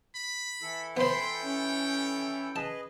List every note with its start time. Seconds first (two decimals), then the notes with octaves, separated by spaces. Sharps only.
0.15 B5
0.62 E3 E4 A4
0.97 B3 C5 G5 B5 C6
1.42 C#4
2.56 G#4 B4 D#5 A5